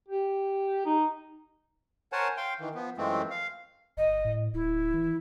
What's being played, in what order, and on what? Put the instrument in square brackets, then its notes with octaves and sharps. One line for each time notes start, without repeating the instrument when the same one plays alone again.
[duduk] G4
D#4
[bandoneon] A#4 C5 C#5 F#5 G#5 A5
F5 G5 C6
D#3 E3
F3 B3
F#2 E3 F3 G#3 A3 C4
F5
[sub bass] G1 [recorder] D#5
[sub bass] A2
[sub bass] D1 [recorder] E4
[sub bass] E3